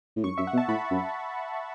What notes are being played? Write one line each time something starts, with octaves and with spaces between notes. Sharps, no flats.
A2
F#2 C#6
F#2 E5
F#5
B2
A5
A2 B5
F#2